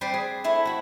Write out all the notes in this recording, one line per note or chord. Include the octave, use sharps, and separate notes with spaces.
G3 C4 B4 C5 D5
G#4
A3 E4 E5
F#4 B5